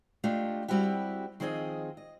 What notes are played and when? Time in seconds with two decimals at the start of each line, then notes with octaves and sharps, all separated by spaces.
0.24 A3 D4 F4 G4 D#5
0.68 G3 C4 E4 F#4 G4
1.40 D#3 F3 C4 G#4 C#5 D#5
1.97 D#5